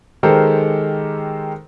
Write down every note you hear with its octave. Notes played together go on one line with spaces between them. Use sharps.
D#3 G#3 G4 A4 A#4 C5